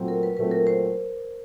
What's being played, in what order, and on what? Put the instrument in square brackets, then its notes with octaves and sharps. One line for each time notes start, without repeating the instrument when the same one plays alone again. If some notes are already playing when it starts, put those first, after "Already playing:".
Already playing: [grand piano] A#2 F#3 A3 C4
[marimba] A#4
B4
[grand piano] A#2 F#3 A3 C4 [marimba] B4
[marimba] A#4
C5